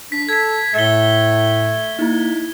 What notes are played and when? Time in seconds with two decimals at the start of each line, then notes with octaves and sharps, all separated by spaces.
0.12 D4 B6
0.29 A4 G#6 B6
0.74 A2 A3 B6 G7
1.99 A#3 D#4 E4